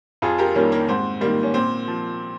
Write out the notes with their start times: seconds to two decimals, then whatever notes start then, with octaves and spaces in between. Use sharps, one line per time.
0.22 F2 F4 G#4
0.38 G4 A#4
0.55 D#3 G3 A#3 C#4
0.72 A#3
0.88 G#2 C4
1.21 D#3 G3 A#3
1.43 C#4
1.54 A#2 C4
1.87 F3